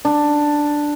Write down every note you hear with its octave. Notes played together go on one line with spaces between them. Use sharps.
D4